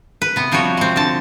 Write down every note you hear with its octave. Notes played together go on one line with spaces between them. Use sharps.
B4
C3 B3
C3 F3 G3 F#4 C#5
G#3 C4
D3 A5